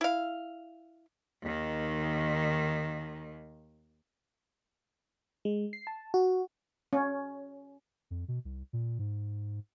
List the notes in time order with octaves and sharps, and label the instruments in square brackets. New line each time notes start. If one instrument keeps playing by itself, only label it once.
[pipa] E4 F5
[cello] D#2 D#3
[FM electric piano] G#3
C7
A5
F#4
[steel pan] C#4
[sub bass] F2
B2
C2
A#2
G#2